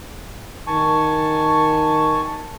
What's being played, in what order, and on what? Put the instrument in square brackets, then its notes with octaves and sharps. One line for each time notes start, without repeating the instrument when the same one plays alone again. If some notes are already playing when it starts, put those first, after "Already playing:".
[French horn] D#3 [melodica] G#5 A5 C#6